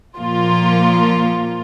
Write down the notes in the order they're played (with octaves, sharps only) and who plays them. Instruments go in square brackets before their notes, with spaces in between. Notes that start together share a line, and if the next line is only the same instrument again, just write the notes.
[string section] A#2 F3 A#3 F4